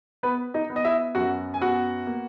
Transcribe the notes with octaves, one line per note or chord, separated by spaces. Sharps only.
B3 B4
D#4 D#5
B3
D#5
E4 E5
F#2 F#4 F#5
G#5
B3 F#4 F#5
A#3